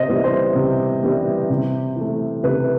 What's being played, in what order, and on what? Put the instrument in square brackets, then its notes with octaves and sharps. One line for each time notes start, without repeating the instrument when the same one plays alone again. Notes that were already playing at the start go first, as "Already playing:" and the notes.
Already playing: [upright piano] C3 C5 D#5
E3 G3 B3
C5
C3
E3 G3 B3
C3
E3 A3
C3 B4